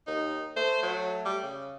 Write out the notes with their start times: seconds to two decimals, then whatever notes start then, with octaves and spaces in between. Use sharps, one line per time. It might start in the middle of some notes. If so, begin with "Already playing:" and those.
0.07 D#2 D#4
0.56 A3 C5
0.82 F#3
1.25 G3
1.43 C#3